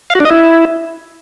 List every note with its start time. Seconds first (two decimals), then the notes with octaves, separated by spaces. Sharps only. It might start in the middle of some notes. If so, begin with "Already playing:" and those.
0.10 F5
0.15 F#4
0.20 D4
0.25 D#5
0.30 E4